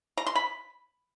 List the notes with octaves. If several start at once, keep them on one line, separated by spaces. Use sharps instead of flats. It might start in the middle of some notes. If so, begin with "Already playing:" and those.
A#5
C6
B5